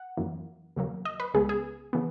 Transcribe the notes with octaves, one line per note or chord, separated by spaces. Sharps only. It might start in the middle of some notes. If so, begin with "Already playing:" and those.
Already playing: F#5
F#2 E3 A#3
D#2 C#3 F#3 A#3
D#5
B4
C#2 C#3 G#3 B3 G#4
G#4
C#3 E3 B3